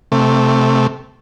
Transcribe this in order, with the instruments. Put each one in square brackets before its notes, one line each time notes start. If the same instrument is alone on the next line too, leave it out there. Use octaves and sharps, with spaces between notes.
[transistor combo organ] C3 A3